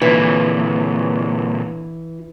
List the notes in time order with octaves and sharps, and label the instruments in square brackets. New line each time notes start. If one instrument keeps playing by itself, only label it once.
[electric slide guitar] A#2 D3 [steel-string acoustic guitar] E3